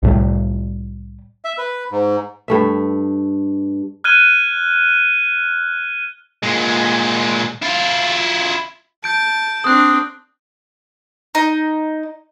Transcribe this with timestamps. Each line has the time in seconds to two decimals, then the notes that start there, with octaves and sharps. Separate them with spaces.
0.03 C2 A2 G3
1.45 E5
1.58 B4
1.91 G#2
2.48 G2 A3 E5
4.04 F6 F#6 G#6 D#7 G7
6.43 A#2 G#3
7.62 E4 F4
9.04 A5 G6 D7
9.64 C4 D4 D#6 F#6
11.35 D#4